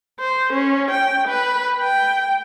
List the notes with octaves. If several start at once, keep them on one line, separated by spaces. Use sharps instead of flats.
C5
C#4
G5
B4
G5